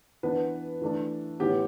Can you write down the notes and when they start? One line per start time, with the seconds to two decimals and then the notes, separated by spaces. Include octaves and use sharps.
0.23 E3 B3 D4 B4
0.81 E3 A3 D4
1.40 A2 E3 B3 G4